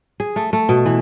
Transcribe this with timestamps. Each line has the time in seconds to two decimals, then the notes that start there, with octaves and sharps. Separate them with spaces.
0.20 G#4
0.36 A3
0.53 A3
0.69 B2
0.86 E3